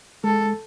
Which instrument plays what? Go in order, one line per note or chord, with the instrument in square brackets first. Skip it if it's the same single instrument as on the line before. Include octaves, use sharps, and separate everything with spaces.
[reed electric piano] G#3 [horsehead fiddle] A4